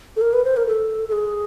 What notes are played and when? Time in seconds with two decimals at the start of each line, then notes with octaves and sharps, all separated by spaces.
0.16 A4
0.21 A#4
0.33 B4
0.45 C5
0.57 A#4
0.67 A4
1.08 A4
1.12 G#4